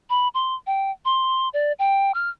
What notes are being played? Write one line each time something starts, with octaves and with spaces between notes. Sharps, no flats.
B5
C6
G5
C6
D5
G5
F6